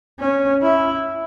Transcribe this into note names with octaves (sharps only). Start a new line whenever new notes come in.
C#4
E4